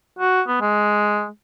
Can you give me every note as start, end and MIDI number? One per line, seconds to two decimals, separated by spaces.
0.19 0.42 66
0.48 0.60 59
0.61 1.27 56